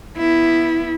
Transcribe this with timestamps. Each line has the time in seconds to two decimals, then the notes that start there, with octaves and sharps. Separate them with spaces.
0.18 B3 E4